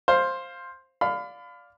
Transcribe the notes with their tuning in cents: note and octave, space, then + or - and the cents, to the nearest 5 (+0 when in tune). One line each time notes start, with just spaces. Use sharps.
C5 +10 F5 +0
D5 -10 F5 +10 B5 +35